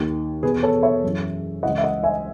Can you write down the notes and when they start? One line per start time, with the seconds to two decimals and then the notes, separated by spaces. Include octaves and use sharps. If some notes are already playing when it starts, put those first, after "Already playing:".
Already playing: D#2 D#3
0.43 E2 B2 G#4 B4
0.63 A4 C#5
0.83 C#5 E5
1.04 F#2 E3
1.63 C#2 C#3 E3 D#5 F#5
1.78 E5
1.83 D#5 F#5
2.03 E5 G#5